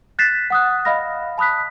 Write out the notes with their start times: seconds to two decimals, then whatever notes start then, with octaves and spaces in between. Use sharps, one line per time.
0.19 F#6 G6 A6 B6 C7 E7
0.50 F#5 D#6 F#6
0.85 D#5 F5 B5 F6 A#6
1.38 A5 B5 D#6 F#6 B6